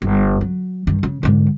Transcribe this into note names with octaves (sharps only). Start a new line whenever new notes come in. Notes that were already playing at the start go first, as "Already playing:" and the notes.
G1
F#3
G2 D#3
C#3
G#2 D3